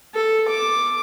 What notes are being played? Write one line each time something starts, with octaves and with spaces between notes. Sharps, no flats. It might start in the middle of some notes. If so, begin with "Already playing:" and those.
A4
D6